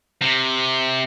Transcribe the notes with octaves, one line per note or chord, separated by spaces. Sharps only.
C3